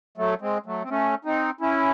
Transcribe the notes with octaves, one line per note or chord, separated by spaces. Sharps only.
F#3 A3
G#3 C4
F#3 A3
C4
A3 C#4
C4 D#4
C#4 E4